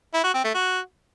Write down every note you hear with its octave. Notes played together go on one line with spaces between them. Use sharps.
E4
F#4
C4
A3
F#4